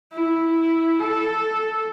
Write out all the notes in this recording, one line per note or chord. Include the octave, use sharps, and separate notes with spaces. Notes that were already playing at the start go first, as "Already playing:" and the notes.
E4
A4